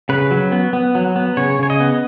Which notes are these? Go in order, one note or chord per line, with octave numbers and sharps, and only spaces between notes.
C#3 B4
F#3
B3
B3
F#3
B3
C#3 C#5
C#3 C#5
D#5
B3